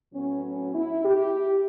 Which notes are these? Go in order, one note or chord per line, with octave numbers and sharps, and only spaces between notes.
A2 F#3 B3 C#4
C#4
E4
G4